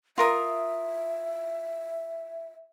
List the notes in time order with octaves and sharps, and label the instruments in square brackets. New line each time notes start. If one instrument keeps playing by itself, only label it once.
[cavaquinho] F4 A#4 D#6 [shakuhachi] E5